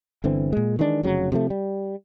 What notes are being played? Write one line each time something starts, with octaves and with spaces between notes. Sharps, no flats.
G1 D3 E3 C4
A#2 G#3
D#3 E3 G#3 D4
F1 C#3 F#3
C3 F3 G3 A3
G3